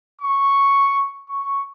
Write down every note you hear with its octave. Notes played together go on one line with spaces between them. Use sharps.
C#6
C#6